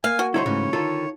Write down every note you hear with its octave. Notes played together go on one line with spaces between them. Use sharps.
A#3 F5 G#5
F#4
D3 G3 D#4 E4 A4 C5 C#5
G#2 C#3 E3 A3
D3 D#3 F4 A4